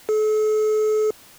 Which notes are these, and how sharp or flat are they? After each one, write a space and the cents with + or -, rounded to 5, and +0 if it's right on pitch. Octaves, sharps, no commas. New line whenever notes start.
A4 -40